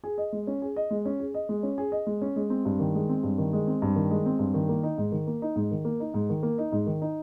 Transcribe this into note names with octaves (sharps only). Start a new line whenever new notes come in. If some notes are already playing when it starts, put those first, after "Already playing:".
G#4
D#5
G#3
C#4
G#4
D#5
G#3
C#4
G#4
D#5
G#3
C#4
G#4
D#5
G#3
C#4
G#3
C4
G2
D#3
G#3
C4
G2
D#3
G#3
C4
G2
D#3
G#3
C4
G2
D#3
A#3
D#4
G#2
D#3
A#3
D#4
G#2
D#3
A#3
D#4
G#2
D#3
A#3
D#4
G#2
D#3
D#4